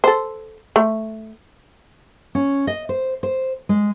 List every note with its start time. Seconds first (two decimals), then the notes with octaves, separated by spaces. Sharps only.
0.04 A4 C5
0.76 A3
2.35 C#4
2.67 D#5
2.89 C5
3.23 C5
3.69 G#3